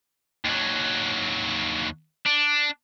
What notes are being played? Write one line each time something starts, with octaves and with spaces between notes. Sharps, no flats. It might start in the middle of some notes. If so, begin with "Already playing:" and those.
D#2 F#3
D4